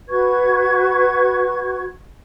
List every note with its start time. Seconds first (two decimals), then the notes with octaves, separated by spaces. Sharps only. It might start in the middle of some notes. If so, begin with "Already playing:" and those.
0.08 F#4 B4 C#6 G#6